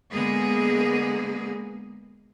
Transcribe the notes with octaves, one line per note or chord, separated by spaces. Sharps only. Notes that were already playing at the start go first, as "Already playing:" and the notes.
D3 G#3 A#3 B3 G#4